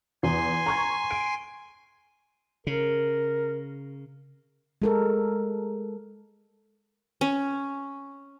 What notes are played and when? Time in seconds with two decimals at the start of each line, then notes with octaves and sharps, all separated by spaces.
0.23 E2 G#5 C6
0.66 A#5 C#6 G#6
1.11 D7
2.67 C#3 A#4
4.82 G#3 A4 A#4
7.21 C#4